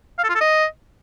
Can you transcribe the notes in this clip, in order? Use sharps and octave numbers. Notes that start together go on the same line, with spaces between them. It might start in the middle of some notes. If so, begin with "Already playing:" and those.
F5
A4
F4
A4
D#5